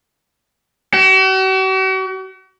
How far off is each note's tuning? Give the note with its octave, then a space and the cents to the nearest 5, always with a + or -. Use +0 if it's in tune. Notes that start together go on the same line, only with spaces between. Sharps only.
F#4 +45